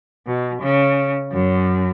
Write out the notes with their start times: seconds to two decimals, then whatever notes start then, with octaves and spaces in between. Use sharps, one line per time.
0.27 B2
0.62 C#3
1.32 F#2